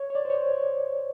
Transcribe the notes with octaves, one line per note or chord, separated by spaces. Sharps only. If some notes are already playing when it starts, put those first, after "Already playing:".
Already playing: C#5
C#5
D5
C5
C#5